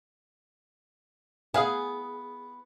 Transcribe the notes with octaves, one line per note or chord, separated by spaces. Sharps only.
B3 G#4 F5